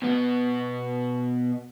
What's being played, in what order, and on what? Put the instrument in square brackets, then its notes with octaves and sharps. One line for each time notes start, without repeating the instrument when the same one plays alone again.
[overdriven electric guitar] B2 B3